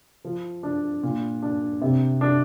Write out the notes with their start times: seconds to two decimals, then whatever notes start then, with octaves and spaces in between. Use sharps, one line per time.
0.25 F3
0.63 D4
1.03 A#2
1.42 D4
1.82 C3
2.21 D4